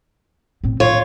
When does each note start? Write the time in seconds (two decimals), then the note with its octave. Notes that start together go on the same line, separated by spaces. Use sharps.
0.64 A2 C4
0.80 A2 E3 F4 C#5